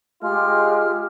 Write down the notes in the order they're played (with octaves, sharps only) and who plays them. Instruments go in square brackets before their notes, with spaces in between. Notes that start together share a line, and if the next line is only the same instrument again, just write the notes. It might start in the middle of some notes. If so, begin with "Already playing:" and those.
[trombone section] G#3 F4 [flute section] G4 F6